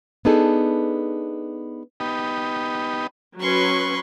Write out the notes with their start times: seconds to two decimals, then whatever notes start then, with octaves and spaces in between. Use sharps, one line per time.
0.25 B3 D4 D#4 G#4 A4
2.00 B3 D#4 G4
3.40 F#3 C#4 B4 C6 C#6